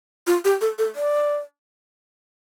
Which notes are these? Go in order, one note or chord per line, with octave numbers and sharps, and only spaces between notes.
F4
G4
A4
A4
D5